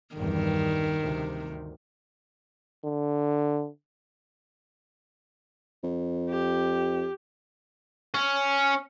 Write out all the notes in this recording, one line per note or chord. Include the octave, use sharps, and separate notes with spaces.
B1 E2 G2 D#3
D2 C3
D3
F2
G4
C#4